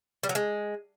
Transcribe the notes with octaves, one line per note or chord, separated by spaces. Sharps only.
G3
F#3
G#3